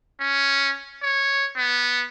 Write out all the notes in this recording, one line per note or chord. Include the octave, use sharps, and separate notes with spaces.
C#4
C#5
B3